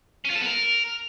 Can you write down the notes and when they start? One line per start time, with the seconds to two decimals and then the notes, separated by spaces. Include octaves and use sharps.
0.25 C#4
0.30 F4
0.35 A4
0.41 B3
0.46 A#4